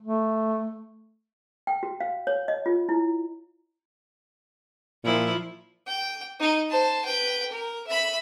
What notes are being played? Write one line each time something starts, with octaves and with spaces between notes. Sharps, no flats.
A3
G5
F#4
F5
C#5
D#5
F4
E4
A#2 F3 E4
G5
D#4
C5 A5
B4 G5
A#4
E5 B5